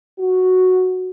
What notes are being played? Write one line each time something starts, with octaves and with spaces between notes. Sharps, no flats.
F#4